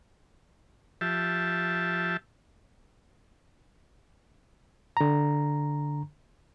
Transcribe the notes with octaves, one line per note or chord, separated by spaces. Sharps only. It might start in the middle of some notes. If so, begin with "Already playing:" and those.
F3 G4 E5 A5
D3 A#5